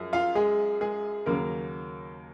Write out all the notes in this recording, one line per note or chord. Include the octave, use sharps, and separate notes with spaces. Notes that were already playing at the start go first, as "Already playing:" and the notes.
Already playing: F#2 F3 G#3
F4 F5
G#3 G#4
G#3 G#4
D#2 C#3 F#3 A#3 A#4